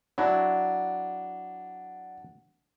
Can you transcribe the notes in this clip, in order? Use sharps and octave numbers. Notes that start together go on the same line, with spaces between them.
F#3 D4 E4 F#5